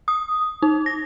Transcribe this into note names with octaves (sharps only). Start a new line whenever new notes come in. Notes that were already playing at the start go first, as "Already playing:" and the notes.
D#6
D#4
A#6